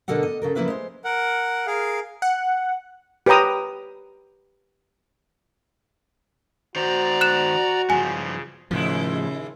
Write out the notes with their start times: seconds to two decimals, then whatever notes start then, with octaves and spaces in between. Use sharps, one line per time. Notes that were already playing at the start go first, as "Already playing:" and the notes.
0.08 B2 D3 A4 A#4 F#5
0.23 D#5
0.42 C#3 A4 A#4
0.55 C#3 F3 A#3 E4 B4 E5
0.68 G#3 C5
1.04 A#4 F#5
1.67 G#4 A#4 F5
2.22 F#5
3.26 G4 B4 C#5 G5 A#5 D#6
6.76 D#3 F#4 C5 D5 A#5
7.21 F#6 E7
7.90 G2 C#3 F3 G#5
8.71 D#2 A2 C#3 F3 G#3 E4